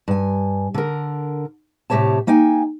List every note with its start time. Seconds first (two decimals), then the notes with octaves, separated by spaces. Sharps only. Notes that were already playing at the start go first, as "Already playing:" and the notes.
0.08 G2 G#5
0.74 D3 A#4
1.90 A2 C3 F#3 G4 C#5 A5
2.27 A#3 D#4 G5 G#5